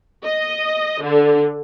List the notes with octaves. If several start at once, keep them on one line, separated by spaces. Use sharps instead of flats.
D#5
D3